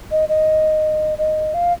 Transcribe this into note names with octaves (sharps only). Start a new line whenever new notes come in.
D#5
D#5
D#5
F5